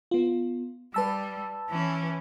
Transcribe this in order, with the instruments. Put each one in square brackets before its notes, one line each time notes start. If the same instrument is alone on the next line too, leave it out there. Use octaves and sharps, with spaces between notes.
[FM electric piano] B3 F4
[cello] G3 [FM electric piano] B4 A5 E6
[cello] E3 C#4